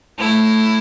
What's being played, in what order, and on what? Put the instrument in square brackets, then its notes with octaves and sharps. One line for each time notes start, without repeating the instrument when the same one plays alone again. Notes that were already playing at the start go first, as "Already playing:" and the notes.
[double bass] A3 [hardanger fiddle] E4